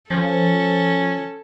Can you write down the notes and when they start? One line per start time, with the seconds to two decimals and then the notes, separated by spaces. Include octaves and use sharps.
0.10 F3 C#4 A4